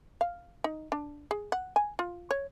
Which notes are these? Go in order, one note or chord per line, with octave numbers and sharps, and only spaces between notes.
F5
D#4
D4
G#4
F#5
G#5
F4
C#5